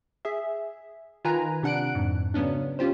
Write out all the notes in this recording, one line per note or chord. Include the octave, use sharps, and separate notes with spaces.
G#4 E5
D#3 F4 B4 G#5 A#5
C3 D4 F#5 F#6 D7
F2 G#2
C#3 F#3 B3 C#4 D4
C#4 F4 G4 C5